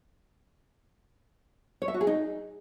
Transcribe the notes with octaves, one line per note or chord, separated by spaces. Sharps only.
C#5
E5
F#4
G#4
D#4